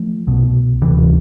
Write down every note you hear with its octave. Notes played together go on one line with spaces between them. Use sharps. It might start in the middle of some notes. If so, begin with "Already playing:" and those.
Already playing: F3 A3
C2 B2
D2 C3 E3